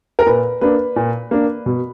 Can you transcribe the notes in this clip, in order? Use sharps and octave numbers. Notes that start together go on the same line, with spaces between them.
A#4
A#2 B4
A#3 D4 B4
A#2
A#3 D4
B2